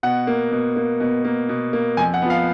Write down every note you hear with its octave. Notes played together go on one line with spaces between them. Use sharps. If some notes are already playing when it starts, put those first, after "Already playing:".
B2 F#5
A#3
B2
A#3
B2
A#3
B2
A#3
F2 G#5
F#5
F3 B3
F5